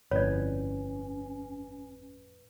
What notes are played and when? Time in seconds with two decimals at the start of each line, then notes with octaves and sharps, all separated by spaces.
0.11 G1 F2 A2 C#4 B4 C#5 D5